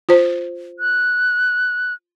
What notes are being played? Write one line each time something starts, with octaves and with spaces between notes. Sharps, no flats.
F4 C5
F#6